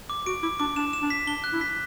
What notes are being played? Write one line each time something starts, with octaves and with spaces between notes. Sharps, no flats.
D6
F#4 D7
E4 D6
D4 D6
D4 E7
E7
D4
B6
D4 G7
F#6
E4
B6